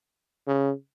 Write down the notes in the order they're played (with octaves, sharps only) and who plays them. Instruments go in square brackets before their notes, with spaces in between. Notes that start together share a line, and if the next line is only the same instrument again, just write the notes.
[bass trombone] C#3